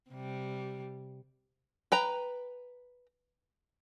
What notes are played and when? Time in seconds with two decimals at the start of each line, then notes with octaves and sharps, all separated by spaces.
0.10 C3 G3
1.92 B4 G5 A#5